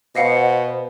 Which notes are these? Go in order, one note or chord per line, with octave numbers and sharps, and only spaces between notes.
B2 C5 D#5 F5 F#5